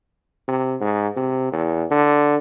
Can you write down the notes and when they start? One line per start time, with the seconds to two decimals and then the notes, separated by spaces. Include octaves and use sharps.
0.48 C3
0.81 G#2
1.17 C3
1.53 E2
1.91 D3